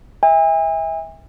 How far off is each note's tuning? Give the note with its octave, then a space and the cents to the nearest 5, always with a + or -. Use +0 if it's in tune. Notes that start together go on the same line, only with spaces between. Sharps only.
E5 -25 G#5 -40